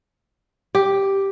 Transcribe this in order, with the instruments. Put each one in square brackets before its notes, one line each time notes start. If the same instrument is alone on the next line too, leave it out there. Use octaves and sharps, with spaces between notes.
[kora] G4